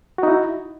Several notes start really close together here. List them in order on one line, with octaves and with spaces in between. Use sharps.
F#4 D#4 E4